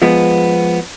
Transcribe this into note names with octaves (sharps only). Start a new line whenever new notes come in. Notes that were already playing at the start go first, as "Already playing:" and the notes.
F3 G#3 B3